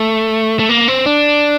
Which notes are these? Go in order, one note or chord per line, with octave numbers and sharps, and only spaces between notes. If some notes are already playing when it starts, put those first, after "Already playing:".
Already playing: A3
A3
A#3
C4
D4